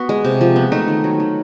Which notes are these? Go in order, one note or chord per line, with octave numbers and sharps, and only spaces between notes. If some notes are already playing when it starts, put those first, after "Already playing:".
Already playing: B3 F#4
G#3
C3
F3
B3
A3 D#4
D#3
F#3
D#3